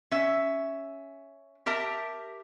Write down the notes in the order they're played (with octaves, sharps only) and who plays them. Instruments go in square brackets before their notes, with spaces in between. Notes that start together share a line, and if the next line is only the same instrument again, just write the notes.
[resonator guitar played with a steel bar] C#4 E5
G4 A#4 E5 A5